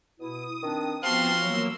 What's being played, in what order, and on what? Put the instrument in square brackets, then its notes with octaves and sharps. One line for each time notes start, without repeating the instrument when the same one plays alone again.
[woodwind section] B2 E4 [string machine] D#6
[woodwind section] D#3 C4 D4
[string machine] F3 B3 [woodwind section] C4 A5 [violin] F#4 C6 [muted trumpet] F5
[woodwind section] F#2 E3 F#3 [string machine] A#3 E6